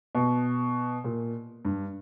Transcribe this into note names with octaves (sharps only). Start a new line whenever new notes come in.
B2
A#2
G2